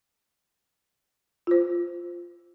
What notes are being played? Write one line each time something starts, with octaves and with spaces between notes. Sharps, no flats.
F4 C5